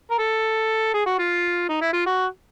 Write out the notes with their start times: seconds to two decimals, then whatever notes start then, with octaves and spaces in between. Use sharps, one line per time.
0.11 A#4
0.19 A4
0.94 G#4
1.06 F#4
1.18 F4
1.68 D#4
1.81 E4
1.93 F4
2.06 F#4